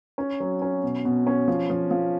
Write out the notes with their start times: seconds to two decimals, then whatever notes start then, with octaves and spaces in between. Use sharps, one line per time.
0.18 C#4
0.40 F#3
0.62 C#4
0.83 B2
1.05 B2
1.27 C#4
1.48 F3
1.70 F3
1.91 F3